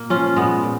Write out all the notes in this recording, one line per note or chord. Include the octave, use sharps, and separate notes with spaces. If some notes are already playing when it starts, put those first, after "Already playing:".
Already playing: A#2 A#3
F3 C#4 F4
A#2 G#3 B3
A#2